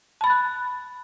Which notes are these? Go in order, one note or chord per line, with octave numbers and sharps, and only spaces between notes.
A5 B5 F#6 A6